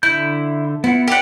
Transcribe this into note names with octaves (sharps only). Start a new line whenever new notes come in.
D3 E4 G6
B3 E4 F4 F#5
G4 A#4 D5 F#5